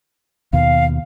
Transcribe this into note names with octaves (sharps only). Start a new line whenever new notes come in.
D#2 B2 F5